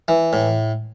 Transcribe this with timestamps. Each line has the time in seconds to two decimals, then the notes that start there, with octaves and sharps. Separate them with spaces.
0.08 E3
0.33 A2